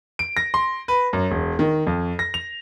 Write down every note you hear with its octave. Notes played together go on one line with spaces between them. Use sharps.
D7
A#6
C6
B4
F#2
E1
D#3
F2
A#6
F7